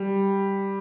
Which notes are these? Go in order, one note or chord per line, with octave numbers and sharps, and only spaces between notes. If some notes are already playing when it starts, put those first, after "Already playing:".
Already playing: G3